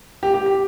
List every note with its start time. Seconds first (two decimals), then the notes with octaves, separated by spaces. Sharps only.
0.23 G4
0.34 G4
0.46 G4